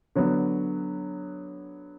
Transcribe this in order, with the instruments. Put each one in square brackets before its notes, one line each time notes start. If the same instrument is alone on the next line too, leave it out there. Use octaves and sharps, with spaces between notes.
[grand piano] D3 F#3 B3